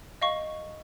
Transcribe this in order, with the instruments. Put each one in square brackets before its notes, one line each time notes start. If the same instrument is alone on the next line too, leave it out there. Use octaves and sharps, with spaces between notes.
[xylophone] D#5 F5 C#6